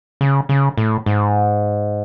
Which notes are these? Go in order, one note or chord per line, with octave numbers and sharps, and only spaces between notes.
C#3
C#3
A2
G#2